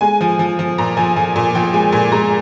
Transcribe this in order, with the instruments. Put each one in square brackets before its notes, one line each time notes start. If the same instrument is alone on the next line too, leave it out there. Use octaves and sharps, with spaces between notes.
[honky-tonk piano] G#3 G#5
F3
F3
F3
A#2 A#5
F3 G#5
F3 G#5
A#2 G#5
F3 G5
G#3 G#5
A#2 G#5
G#3 A#5